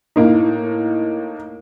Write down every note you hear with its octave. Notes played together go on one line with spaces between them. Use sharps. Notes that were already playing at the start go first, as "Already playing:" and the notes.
A2 A#3 D#4